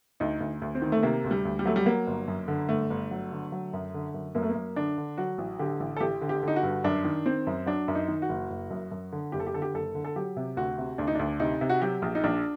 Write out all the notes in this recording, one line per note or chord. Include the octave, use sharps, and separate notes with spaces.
D2 D#4
D2
D2
C4
D#3
A3
C3 A#3
D2
G3
D2
G3
F#3 A3
G3
F#3 A#3
G1
F#2
D3
G1 A3
G1
F#3
D3
F#3
F#2
D3
F#2
F#2 A#3
A3
A#3
F#2
D3 D4
D3
F#3 F#4
A1
D3 G4
A1
A4
A1 G4
D3
G4
D3 D#4
F#4
G2
F#2 D4
D#3
D#3 C4
F#2
F#3 D4
F#2
D#4
D#3
F#4
F#1
F#1
F#2
F#2
D3
F#1 G4
A4
G4
D3 A4
G4
F#1 A4
D3
A4
F#3 G4
C3
D2 F#4
C3
D2 D4
D#4
D2 D4
C3 D#4
C3
F#4
F#3 G4
A#1
D#4
A#1 D4